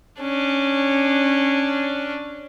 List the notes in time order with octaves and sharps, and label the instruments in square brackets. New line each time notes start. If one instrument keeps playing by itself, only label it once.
[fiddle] C#4 D4